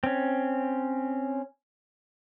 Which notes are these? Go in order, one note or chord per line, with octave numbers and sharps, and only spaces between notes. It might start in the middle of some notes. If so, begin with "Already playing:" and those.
C4 C#4